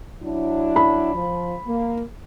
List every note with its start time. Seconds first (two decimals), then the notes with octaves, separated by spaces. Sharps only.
0.22 F#3 D4 E4
0.76 B5
1.14 F3
1.67 A#3